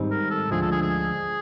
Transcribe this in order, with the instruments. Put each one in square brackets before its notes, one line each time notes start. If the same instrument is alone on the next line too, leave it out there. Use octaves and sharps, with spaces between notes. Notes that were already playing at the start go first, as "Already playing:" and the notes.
Already playing: [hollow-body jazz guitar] G#2 D#3 G3 C4 D#4
[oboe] A#4
A4
[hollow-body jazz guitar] D2 D3 F3 G#3 [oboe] G#4
[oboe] A4
G#4
G#4